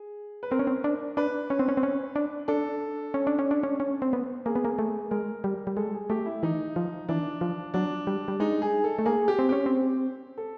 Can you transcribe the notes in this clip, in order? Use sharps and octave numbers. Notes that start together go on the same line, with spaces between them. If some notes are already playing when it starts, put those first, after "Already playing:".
Already playing: G#4
B4
C4 A#4
C#4
C4
D4
D4 B4
C#4
C4
C#4
C4
C#4
D4
D4 A4
C#4
D4
C#4
D4
C#4
C#4
C4
B3
A#3 G#4
B3
A#3
A3
G#3 A#4
G3
G3
G#3 A4
G#4
A3 G4
E4
E3 D#4
F3
E3 D4
F3
F#3 D4
G3
G3
G#3 D#4
G#4
A4
A3
A#3 G#4
G4
C4
C#4 G4
C4
A4